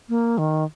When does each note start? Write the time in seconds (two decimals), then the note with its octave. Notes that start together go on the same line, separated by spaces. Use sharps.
0.09 A#3
0.38 D#3